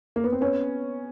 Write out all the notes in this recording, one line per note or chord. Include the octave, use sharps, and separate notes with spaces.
A#3
B3
C4
B3 C#4